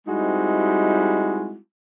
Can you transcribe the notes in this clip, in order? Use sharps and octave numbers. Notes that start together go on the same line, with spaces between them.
G3 G#3 C4 D#4 E4 F#4